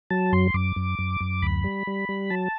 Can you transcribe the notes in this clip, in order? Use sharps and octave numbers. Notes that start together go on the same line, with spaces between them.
F#3 A5
F#2 C6
F#2 D6
F#2
F#2
F#2
D2 B5
G3
G3
G3
F#3 A5